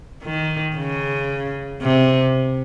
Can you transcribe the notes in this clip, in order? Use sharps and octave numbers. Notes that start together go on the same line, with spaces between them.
D#3
C#3
C3